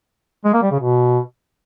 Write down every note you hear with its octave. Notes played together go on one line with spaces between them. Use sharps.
G#3
A#3
G3
C#3
B2